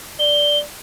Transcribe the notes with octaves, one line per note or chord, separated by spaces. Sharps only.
D5 G7